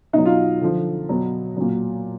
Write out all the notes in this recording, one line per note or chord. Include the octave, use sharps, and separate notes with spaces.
B2 F#3 D#4
F4
D3 F3
B2 F#3
A#2 F#3